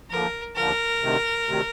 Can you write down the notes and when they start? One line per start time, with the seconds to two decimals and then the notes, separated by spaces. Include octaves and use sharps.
0.11 D#2 D3 F3 A#4
0.56 D#2 D3 F3 A#4
1.00 D2 C3 D#3
1.45 D2 C3 D#3